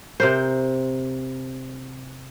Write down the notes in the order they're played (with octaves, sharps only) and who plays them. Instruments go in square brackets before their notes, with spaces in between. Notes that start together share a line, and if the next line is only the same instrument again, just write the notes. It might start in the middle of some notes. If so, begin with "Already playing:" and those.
[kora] C3 A#4 C5